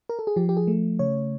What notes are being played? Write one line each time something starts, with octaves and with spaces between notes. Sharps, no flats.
A#4
A4
G#4
F3 G4
G4
G#4
A3
C#3 C#5